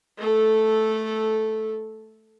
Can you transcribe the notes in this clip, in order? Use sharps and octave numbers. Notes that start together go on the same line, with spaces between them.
A3 A4